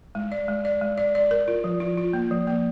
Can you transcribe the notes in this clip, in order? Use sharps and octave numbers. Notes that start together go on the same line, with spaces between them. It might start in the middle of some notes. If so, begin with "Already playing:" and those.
G#3
D5
G#3
D5
G#3
D5
D5
A#4
F4
F3
F4
F4
A#3
F3
A#3